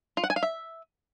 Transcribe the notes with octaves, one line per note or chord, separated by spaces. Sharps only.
F4
F#5
G#5
F5
E5